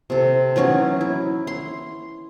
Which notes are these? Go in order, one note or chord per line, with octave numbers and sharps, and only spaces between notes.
C3 A4
E3 F#3 C#4 D#4
E4
C6